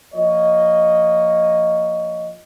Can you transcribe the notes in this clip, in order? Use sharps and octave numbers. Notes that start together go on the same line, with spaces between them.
F3 A#3 C#5 D#5